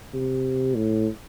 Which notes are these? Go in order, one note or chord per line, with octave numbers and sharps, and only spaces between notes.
C3
A2